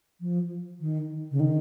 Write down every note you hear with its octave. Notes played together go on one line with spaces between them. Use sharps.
F3
D#3
C#3
D#3